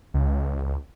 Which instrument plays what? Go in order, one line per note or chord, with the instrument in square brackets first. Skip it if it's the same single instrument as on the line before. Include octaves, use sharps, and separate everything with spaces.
[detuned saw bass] C#2